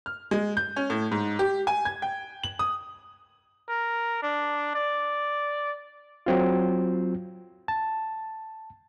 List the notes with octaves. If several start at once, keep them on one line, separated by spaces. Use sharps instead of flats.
F6
G#3
G6
C#4
A2
G#2
G4
G#5
G#6
G5
F#7
D#6
A#4
D4
D5
F#3 C4 F4
A5